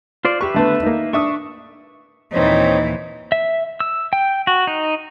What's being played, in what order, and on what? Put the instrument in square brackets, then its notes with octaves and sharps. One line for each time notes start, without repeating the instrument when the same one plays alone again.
[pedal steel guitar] F4 C5 D5
[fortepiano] G4 C#6 [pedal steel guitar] B4 E5
[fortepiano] D3 A3 B3
A#3 D#4
[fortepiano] D4 E5 D#6 [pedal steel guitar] C#6
[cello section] D#2 A#2 E3 [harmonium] C4 C5 C#5 [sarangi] D#4
[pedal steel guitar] E5
E6
G5
F#4
D#4